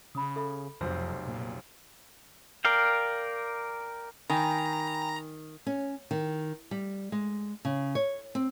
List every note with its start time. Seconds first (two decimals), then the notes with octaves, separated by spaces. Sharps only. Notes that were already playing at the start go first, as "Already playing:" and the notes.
0.15 C#3 B5 D#6
0.36 A4 E5 B5
0.81 F1 B1 F2 C5
1.27 A#2
2.65 A#4 D5 F5 G5
4.30 D#3 G5 G#5 A#5 B5
5.66 C#4
6.11 D#3
6.71 G3
7.12 G#3
7.65 C#3
7.95 C#5
8.35 C4